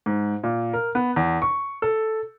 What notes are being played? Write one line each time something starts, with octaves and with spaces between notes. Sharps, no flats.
G#2
A#2
A#4
B3
E2
C#6
A4